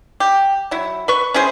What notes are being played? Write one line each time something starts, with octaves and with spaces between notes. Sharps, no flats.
G4
F#3 E4
B4 C#6
C#4 E4 G#4 C5